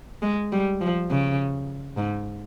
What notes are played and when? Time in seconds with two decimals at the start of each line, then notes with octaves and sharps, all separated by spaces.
0.22 G#3
0.52 G3
0.81 F3
1.10 C#3
1.97 G#2